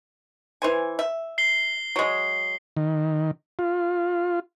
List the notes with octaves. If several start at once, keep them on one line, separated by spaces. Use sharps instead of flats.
E3 C5 G#5
E5
C7 G7
F#3 G#3
D#3
F4